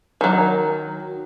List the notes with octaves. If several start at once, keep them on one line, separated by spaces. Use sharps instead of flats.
D#3 F#3